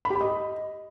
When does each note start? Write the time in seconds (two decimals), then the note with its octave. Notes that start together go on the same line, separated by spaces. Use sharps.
0.05 B5
0.10 G4
0.15 B5
0.21 D#5